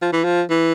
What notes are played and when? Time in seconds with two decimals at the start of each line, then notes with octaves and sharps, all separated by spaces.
0.02 F3
0.12 E3
0.24 F3
0.50 E3